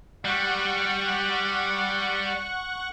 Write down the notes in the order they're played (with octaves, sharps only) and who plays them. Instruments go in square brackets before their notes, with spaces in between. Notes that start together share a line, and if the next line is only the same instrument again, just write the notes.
[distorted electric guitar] G3 [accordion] F#5 C#6 F#6